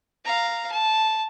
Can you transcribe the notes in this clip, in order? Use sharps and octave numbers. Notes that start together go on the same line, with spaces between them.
F5 A#5
A5